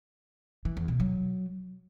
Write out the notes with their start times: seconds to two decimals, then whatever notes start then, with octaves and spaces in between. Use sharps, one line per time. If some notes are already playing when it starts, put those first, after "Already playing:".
0.65 E3
0.77 E2
0.88 B2
1.00 F#3